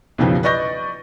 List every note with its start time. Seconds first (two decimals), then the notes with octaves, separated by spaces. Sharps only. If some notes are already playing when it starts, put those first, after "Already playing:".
0.18 B1 F2 C#3 E3 F3 G3
0.43 B4 D5 D#5 C#6 G6 A#6